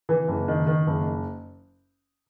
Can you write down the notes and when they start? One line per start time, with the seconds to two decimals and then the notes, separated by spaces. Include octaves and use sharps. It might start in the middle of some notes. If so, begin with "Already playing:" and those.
0.09 E3
0.28 F#1
0.48 D#3
0.67 D#3
0.87 F#1